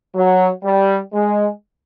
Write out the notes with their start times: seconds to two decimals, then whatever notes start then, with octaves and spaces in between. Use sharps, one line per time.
0.15 F#3
0.64 G3
1.13 G#3